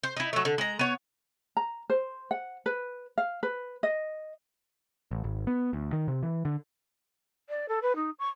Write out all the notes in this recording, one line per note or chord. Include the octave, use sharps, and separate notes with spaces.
C5
D#4 E4
F#3 A3
D3
G#3 A#5
B3 C#5
A#5
C5
F#5
B4
F5
B4
D#5
A1
G#1
B3
D2
D#3
C3
E3
D3
D5
A4
B4
D#4
C#6